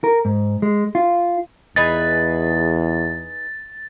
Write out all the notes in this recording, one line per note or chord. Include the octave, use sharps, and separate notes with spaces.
A#4
G#2
G#3
F4
E2 D#4 G#4 B4 A6